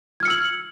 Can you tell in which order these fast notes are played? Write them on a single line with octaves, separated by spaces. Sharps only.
G#6 F6 C#7 E6 F#7